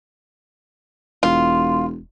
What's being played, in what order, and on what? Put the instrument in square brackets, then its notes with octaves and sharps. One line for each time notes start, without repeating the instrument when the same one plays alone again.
[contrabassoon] E1 [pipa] F4